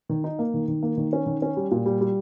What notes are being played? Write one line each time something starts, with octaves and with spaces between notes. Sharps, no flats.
D#3
D#4
A#3
D#3
D#3
A#3
D#3
C#4
D#3
C#4
G3
A#2
G3
G3